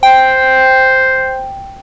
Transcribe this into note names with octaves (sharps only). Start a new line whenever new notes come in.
C5 G5